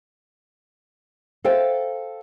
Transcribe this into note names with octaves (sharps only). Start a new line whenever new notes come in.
A4 C5 F5 G5